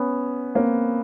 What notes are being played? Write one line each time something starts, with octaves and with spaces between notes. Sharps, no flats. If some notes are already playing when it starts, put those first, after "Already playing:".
Already playing: B3 C#4
A#3 C4